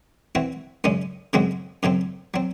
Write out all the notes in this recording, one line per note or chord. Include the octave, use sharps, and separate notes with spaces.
E3 C4 F#4
F#2 C#3 G#3 C#4
F#2 C#3 G#3 C4 F#4
F#2 C#3 F#3 C4
F#3 C4